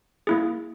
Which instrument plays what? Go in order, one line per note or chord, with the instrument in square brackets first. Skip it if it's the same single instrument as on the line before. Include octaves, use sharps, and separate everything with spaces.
[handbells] A#3 E4 G#4